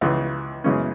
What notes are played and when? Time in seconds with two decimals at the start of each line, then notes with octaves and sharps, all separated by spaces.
0.01 C#2 C#3 E3
0.64 F#2 C#3 E3 G#3 C#4